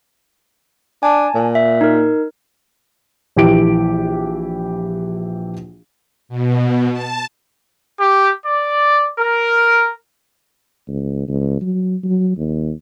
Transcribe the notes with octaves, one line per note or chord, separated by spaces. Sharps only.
D4 G#5 A5
A#2
E5
D#4 A#4
A#1 E3 G4 D7
B2
A5
G4
D5
A#4
C#2
C#2
F#3
F#3
D#2